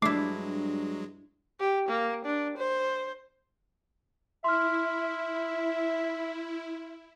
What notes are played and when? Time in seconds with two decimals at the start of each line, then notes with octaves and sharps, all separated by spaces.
0.02 G2 F#3 G#3 A3 D4 E4 D6 C7
1.60 G4
1.89 A#3
2.25 D4
2.58 C5
4.44 E4 E5 C6 F6